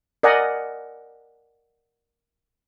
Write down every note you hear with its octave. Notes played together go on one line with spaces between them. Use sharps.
A#4 D5 D#5 F#5 G#5 A#5